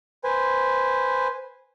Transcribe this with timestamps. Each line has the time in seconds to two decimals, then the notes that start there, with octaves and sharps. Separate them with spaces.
0.24 B4 C5 G#5